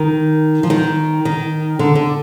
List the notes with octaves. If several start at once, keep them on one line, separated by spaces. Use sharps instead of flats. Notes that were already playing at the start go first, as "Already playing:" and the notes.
Already playing: D#3
F3
D#3
D#3
D3
D3